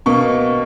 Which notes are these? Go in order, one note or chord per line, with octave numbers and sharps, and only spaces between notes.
B2 A#3 C#6